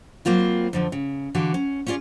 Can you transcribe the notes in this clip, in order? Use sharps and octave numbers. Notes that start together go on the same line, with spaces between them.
F#3 A#3 C4 F4 B4
F2 D3 F3
C#3
D3 E3 F#4 F5
C#4
C#4 E4 F4 G#4 D5